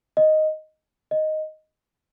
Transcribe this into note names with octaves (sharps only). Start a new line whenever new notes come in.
D#5
D#5